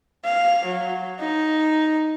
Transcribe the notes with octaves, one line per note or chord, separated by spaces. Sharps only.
F5
F#3
D#4